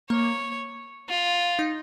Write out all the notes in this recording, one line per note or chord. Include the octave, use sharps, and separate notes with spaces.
A#3 C#5
F4
D#4